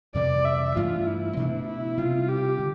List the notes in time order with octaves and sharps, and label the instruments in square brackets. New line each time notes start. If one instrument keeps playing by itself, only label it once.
[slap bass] F2 C3 E3 G3 [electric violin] D5
[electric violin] E5
[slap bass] G2 E3 A3 D4 [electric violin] F4
[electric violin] E4
[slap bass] B2 A3 D4
[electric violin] E4
[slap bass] C3 G3 C4 [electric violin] F4
[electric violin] G4
[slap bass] D3